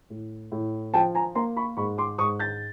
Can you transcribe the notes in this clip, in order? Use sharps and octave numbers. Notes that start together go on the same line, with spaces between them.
A2
A2
F3 G5 A5
G#5 A#5
A#3 A#5 C6
B5 C#6
G#2 B5 C#6
C6 D6
G#2 C#6 D#6
G6 A6